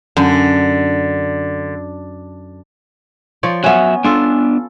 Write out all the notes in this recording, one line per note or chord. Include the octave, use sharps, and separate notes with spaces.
F#2 D3
F3 C#5 D5
F#3 B3 C#4 E5
B3 D4 F4 A4